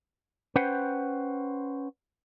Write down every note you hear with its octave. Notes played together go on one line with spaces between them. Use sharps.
C#4 B4 C5 F#5 G5